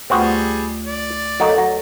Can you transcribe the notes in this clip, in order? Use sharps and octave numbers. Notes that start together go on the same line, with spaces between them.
D2 G3 A3 B3 C4 F4 F#4 G#4
D5
A6
F#3 A#3 D#4 A4 C#5 F#5
F#3 C#5 A#6